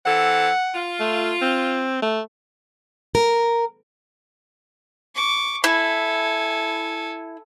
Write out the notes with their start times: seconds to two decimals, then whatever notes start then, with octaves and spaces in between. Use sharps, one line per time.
0.06 E3 C4 A4 F#5
0.75 F4
1.00 A3
1.42 C4
2.02 A3
3.15 A#4
5.15 C#6 D6
5.64 E4 A4 G#5